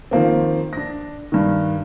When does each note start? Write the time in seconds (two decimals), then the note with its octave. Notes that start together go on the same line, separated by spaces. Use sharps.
0.11 D#3 F3 A#3 C4
0.73 D4 A#6
1.32 G2 D#3